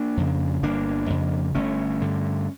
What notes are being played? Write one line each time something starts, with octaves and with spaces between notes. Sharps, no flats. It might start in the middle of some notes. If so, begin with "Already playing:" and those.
Already playing: A#3 D4
F2 C#3
G1 A#3 D4
F2 C#3
G1 A3 C#4
G2 D3